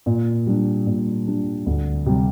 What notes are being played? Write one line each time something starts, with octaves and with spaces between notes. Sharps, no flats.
A#2
G3 D4
A#2
G3 D4
D2
C3 G3